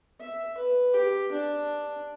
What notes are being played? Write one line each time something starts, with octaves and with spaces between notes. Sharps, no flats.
E5
B4
G4
D4